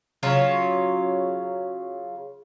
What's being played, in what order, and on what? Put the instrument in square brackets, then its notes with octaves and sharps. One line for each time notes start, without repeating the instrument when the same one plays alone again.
[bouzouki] C#3 F#3 F4 C#5